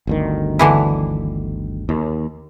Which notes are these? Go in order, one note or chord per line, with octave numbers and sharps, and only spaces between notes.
G1 D2 D#3
D3 E3 E4
D#2